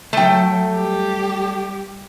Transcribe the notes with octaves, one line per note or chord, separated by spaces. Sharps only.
F#3 A3 G5
G3 G4